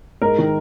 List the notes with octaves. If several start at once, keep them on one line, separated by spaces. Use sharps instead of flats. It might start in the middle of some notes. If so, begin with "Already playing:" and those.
G#2 A#4
D#3